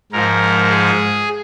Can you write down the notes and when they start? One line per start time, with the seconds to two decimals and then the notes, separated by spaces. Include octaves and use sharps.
0.12 G#2 F3 A#4
0.69 G#4